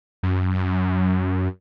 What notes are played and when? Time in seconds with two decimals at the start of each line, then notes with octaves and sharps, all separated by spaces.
0.23 F#2
0.55 F#2